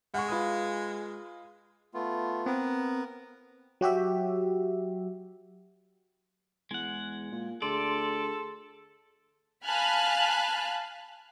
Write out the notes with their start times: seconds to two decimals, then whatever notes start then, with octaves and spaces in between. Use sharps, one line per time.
0.14 G#3 F#5 C#6
0.28 F4 B4 D#6
1.94 A3 B3 F4
2.46 B3 C4 A#4
3.81 F#3 F#4 G4 E5
6.71 E2 G#3 F#5
7.32 A#2
7.62 D2 G#4 A4 D5 C6
9.65 F5 G#5 A5 B5 F6 F#6